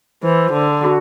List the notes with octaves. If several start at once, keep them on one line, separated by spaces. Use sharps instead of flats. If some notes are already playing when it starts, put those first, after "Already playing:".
E3 C5
D3
F#4